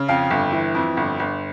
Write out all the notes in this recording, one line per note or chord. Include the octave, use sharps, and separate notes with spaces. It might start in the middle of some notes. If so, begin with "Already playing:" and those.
Already playing: C#3
F2 F5
G1
E3
F2
G1
G1